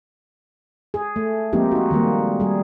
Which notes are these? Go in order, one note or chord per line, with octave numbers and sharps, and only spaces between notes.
G#4
A3
F3 G#3 A#3 C4 D#4 G4
D#4 F#4
D#3 G3 G#3 A#3
G3 G#4